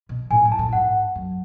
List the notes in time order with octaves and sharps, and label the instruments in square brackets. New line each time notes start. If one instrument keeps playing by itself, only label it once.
[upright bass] B2
[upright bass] A2 [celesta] G#5
[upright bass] A2
[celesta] A5
[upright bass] A2
[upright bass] G#2 [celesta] F#5
[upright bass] F#2